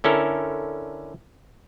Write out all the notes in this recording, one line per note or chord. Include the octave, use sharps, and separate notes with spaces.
D3 C#4 E4 A4 A#4